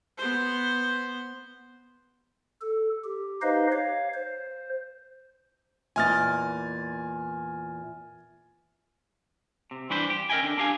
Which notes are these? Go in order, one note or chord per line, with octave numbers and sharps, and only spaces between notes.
B3 C5
A4
G4
D#4 G4 B4 C5 D#5 F5
C#5 F5
C5
E2 A#2 D#5 G#5 F6 A6
C3
G2 E3 D4 B4 C5
G4
C#4 A#4 D#5 E5 G5 G#5
D3 D4
D4 E4 G4 F5 G#5